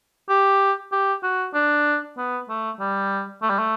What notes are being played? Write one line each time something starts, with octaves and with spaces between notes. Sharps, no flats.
G4
G4
F#4
D4
B3
A3
G3
A3
G3
A3